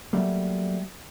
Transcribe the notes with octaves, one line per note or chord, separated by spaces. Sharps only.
F#3 G3 A3 A#3